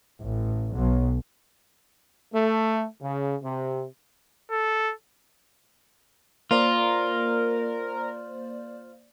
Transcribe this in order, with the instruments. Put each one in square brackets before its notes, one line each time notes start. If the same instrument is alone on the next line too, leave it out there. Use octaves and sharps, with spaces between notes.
[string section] A1
B1
[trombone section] A3
C#3
C3
[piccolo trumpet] A4
[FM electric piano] A#3 C5 D5 [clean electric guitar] F4 [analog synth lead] A#4